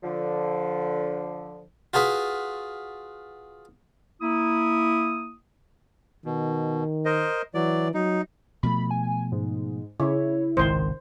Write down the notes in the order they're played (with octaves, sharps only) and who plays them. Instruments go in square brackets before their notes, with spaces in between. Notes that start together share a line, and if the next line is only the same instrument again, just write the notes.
[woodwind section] D3 F3
[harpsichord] F4 F#4 G#4 B4
[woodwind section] A#3 E4 D#6
[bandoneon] B2 [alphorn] D#3
[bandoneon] A#4 C5 D#5
[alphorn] E3 [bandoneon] F#3 D5
[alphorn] F#3 [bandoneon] D#4
[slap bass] B2 F3 A3 [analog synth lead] B5
[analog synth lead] G#5
G#2
[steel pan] C#3 [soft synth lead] E4 [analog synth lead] C#5
[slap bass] G#1 C#2 C3 [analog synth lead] D#3 [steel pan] C5